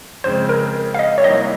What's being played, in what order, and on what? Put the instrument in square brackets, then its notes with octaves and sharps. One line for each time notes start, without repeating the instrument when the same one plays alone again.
[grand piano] F2 C#3 G#3 C4 [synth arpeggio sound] C5
[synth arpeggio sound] A#4
F5
D#5
C#5
[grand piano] C2 C3 D#3 G3 A#3 [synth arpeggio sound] D#5